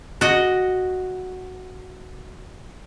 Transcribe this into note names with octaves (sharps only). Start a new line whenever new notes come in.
F#4 D#5